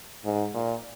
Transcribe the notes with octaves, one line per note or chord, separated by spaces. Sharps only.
G#2
A#2